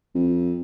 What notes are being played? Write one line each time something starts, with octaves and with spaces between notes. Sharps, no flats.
F2